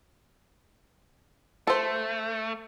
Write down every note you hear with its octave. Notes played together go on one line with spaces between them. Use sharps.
A3 A4 C5